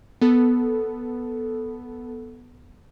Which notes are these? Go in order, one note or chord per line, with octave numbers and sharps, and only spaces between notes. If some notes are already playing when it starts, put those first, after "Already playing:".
B3 A4